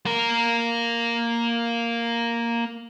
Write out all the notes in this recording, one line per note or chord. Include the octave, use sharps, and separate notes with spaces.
A#3 A#4